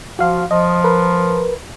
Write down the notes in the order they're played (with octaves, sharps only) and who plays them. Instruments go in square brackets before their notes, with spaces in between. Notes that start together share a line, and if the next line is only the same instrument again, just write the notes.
[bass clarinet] F3 [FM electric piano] F#4 F5
[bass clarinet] F3 [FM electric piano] D#5
[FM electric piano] A#4 B4